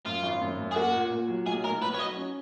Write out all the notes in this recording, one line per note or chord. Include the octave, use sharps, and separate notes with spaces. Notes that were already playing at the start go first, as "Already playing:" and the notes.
F#2 F4
G#1
F#2
F#2
G#4
A#3 F#4
A#2
A#2
F#3
B1 G#4
B1 A#4
B1 B4
C#5
F#3 D#5
C#4